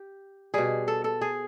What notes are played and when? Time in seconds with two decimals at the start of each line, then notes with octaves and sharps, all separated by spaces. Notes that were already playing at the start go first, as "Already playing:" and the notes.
Already playing: G4
0.54 B2 G3 G#4
0.88 A4
1.04 A4
1.21 G#4